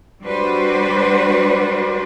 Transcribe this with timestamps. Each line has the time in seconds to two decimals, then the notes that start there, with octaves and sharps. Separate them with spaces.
0.23 G3 D4 F#4 B4 C5 D5